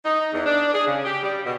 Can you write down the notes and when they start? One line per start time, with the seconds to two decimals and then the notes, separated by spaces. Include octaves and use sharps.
0.05 D#4
0.33 E2
0.46 D4
0.72 G#4
0.86 C#3
1.05 G4
1.23 G3
1.45 B2